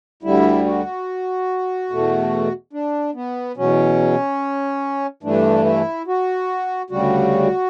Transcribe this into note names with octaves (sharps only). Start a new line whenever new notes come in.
D2 D3 G3 E4
F#4
E2 B2 A3
D4
B3
E2 B2 F#3 C#4
G2 E3 A3 D4
E4
F#4
D2 C#3 G3 F#4